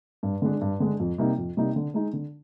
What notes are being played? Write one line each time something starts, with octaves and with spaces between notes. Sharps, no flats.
G2
D3 G#3 D4
G2
D3 G#3 D4
F2
C3 G3 A#3 D#4
F2
C3 G3 A#3 D#4
D3
G#3 D#4
D3